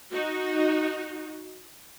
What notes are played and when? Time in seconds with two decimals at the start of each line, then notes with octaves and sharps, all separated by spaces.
0.12 D#4 F#4